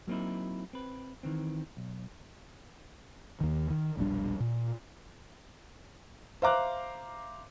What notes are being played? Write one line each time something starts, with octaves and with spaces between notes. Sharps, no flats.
F#3 A#3 C4 D#4 E4
C4 B4
D#3 E3 C4
B1
D#2 D#3
D#3
E1 A#1 G3 D4
A#2
C5 E5 F5 A#5 D6 F#6